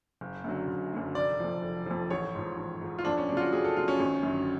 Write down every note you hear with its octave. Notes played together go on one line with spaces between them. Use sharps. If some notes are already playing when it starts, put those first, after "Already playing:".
F#1
F#2 D3 F#3
F#1
F#2 D3 F#3
F1 D5
F2 F3
F1
F2 F3
A1 C#5
G#2 F3
A1
G#2 F3
F4
F2 D4
C#4
C#3 F#3 D4 F4
F#4
F2 G#4
A4
C#3 F#3 F4
C#4
G#1
F#2 D3 F#3